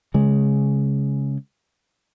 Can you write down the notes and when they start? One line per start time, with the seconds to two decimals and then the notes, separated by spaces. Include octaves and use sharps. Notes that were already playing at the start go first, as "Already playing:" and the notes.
0.14 C#3 G#3